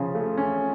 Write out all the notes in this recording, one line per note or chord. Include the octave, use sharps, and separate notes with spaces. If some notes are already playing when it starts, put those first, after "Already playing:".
Already playing: C#3 F3 C#4
A3
C#4